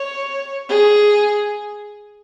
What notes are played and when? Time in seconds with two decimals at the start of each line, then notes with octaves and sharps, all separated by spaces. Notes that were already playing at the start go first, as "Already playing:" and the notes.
Already playing: C#5
0.69 G#4